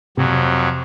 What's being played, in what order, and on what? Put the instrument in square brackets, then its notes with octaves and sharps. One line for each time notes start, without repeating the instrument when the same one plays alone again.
[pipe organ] F2 F#3 [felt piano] C3